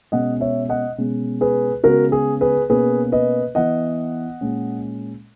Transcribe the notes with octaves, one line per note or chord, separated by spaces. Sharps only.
B2 G#3 C#4 D#5 F#5
C#5 E5
D#5 F#5
B2 G#3 C#4
G#4 B4
C#3 G#3 B3 F#4 A#4
G#4
G#4 B4
B2 A#3 C#4 G#4 B4
B4 D#5
E3 B3 D#5 F#5
A#2 G#3 C#4